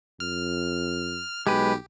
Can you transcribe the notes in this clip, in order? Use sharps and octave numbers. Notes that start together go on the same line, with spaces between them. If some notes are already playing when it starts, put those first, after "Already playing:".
F2 F6
B1 G#3 G4 B4